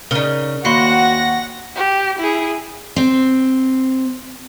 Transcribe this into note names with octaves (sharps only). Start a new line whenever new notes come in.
C#3 D#4 A#4 D5
D#2 F#4 F5 F#5 B5 C6 A#6
G4
E4 G#4
C4 C5